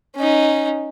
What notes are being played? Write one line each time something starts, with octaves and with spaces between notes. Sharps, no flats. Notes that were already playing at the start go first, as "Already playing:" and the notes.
C#4 D#4